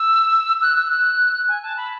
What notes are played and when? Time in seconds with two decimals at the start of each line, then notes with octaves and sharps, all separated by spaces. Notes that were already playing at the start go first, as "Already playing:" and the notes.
Already playing: E6
0.62 F#6
0.76 E6
0.90 F#6
1.48 G#5
1.63 A5
1.77 B5